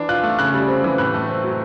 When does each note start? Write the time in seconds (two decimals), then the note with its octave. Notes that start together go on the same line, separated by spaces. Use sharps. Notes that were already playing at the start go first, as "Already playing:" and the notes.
Already playing: E3 D4
0.09 F4 F#6
0.23 A3
0.38 C#3 F#6
0.54 G3
0.68 C4
0.84 E3
0.98 A2 F#6
1.14 A3
1.29 C4
1.44 F#3